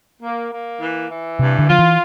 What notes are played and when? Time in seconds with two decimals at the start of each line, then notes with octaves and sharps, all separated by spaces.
0.22 A#3
0.52 A#3
0.81 E3
1.10 E3
1.39 G2 C3
1.59 D3
1.68 F3 F4
1.79 E3